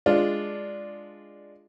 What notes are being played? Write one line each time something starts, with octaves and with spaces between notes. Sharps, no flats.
G#3 D4 F4